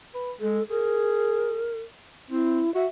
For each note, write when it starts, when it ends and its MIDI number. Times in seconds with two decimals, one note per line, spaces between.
0.15 0.32 71
0.40 0.60 56
0.40 0.63 69
0.70 1.71 68
0.70 1.81 70
2.30 2.62 60
2.30 2.74 64
2.75 2.86 66
2.75 2.88 76